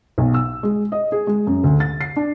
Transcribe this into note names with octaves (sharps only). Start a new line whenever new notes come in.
B1
E6
G#3
D#5
G#4
G#3
F#2
D2
A6
C7
D4